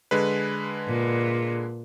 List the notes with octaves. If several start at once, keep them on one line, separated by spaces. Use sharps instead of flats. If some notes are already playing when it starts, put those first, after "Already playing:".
D3 G#3 B4
A#2